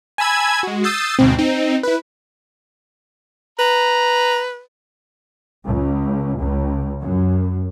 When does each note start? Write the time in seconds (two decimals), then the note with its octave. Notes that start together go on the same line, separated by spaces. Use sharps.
0.18 G#5 A5 B5 E6 G#6
0.63 G#3 F#4
0.84 D#6 E6 G6 A6 C7
1.19 D2 G#2 B2 C4
1.38 C4 D#4
1.83 E4 B4
3.59 B4 A#5
5.65 C#2
6.39 C#2
7.02 F#2